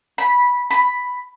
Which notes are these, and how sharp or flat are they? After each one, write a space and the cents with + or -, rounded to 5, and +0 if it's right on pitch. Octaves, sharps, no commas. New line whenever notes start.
B5 -10
B5 +5